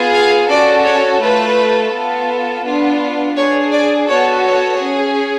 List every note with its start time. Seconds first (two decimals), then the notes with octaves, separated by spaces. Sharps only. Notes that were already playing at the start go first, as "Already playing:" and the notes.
Already playing: B3 F4 G#4
0.14 F5
0.49 C#4 F#4 A4 D5
0.85 C#5
1.21 A3 F4 A4 B4
1.92 B3 F4 A4
2.64 B3 D4 F4
3.36 D4 G#4 C#5
3.72 D5
4.08 B3 F#4 A4 C#5
4.44 C#5
4.80 C#4 G#4